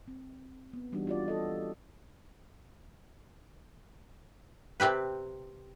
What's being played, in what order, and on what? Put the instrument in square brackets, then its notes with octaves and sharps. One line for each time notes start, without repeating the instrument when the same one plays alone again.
[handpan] C4
B3
E3 G3 D4 D#4 F#4
F4 F#4 D5
A4 D#5
[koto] C3 C4 G4 B4